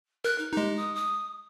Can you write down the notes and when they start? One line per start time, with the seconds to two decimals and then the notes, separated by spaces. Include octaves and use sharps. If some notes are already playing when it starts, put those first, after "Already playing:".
0.25 A#4 F#6
0.38 D#4
0.53 G#3 D#4 G4
0.77 D#6
0.95 D#6